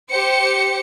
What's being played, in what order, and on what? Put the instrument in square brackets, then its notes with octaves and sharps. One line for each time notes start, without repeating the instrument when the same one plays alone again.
[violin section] G4 C5 C#7